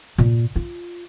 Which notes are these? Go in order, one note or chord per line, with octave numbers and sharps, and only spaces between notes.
A#2
F4